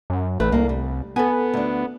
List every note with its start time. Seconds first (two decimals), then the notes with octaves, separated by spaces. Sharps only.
0.10 F#2
0.40 A1 A3 B4
0.52 C2 A#3 D4
0.69 G3
1.16 B3 A4 B4 G#5
1.54 D2 D4